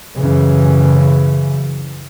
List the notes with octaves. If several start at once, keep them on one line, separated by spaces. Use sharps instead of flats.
F#2 C#3 E3